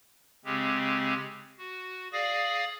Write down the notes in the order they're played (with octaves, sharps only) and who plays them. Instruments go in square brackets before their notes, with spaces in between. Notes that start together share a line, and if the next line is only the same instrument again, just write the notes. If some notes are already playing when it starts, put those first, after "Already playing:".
[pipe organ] C#3 G#3 C4 G4
F#4
G#4 D5 F5 D#6 A#6